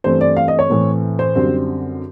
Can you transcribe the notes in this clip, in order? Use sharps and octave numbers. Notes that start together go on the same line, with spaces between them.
G2 E3 A3 C4 C5
D5
F5
D#5
C#5
A2 E3 A3 C4
C5
F#2 D3 G3 C4